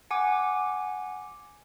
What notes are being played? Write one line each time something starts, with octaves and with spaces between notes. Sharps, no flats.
F#5 G#5 D6